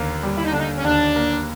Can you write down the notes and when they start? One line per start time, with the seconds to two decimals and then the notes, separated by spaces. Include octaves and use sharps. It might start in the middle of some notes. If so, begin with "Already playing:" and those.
Already playing: D#2 D3 A#3
0.23 G3
0.38 E4
0.45 D#4
0.53 D3 D4
0.59 D#4
0.77 C#4
0.84 D#2 D4
1.16 A#3